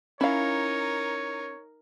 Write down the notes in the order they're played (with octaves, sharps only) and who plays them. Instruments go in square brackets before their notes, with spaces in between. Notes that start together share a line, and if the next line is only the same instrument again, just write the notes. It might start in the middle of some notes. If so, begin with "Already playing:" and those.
[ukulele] C#4 [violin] D#4 A#4 [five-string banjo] E4 F5 [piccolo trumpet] C#5